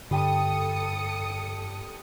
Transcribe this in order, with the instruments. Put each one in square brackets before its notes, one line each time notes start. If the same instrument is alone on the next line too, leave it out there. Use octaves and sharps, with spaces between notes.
[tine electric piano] G2 [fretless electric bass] D3 [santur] G3 G5 A5 [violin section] A4 D#6 C#7